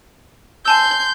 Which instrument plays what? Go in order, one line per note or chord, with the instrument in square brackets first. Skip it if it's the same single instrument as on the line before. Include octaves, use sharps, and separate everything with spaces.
[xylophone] G#5 A5 E6 [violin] C6 G6